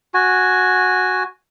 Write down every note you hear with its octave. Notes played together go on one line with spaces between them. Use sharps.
F#4 G#5